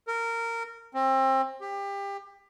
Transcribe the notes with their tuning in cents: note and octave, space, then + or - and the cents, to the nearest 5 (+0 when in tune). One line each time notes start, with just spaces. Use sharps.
A#4 -15
C4 +30
G4 +25